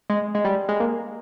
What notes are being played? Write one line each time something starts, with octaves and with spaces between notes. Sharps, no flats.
G#3
G#3
G3
G#3
A#3